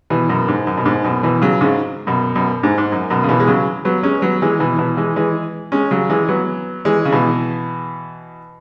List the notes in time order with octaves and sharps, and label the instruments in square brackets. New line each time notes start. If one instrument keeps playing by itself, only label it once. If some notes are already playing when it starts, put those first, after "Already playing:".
[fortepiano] B2 E3
F#2 B2
G#2
F#2
B2
G#2
F#2 B2
B2 E3
C#3 F#3
G#2 C#3
F#2 B2
F#2 B2
G#2
G#2
F#2
F#2 B2
C#3
B2 E3
G#3
C#3 F#3
F#3 B3
G#3 C#4
F#3 B3
E3 G#3
B2 E3
B2 E3
E3 G#3
E3 G#3
G#3 C#4
C#3 F#3
E3 G#3
F#3 B3
E3 G#3
C#3
B2 E3